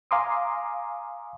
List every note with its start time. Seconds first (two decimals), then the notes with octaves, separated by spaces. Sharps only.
0.11 F5 G#5 A#5 C6 D6 D#6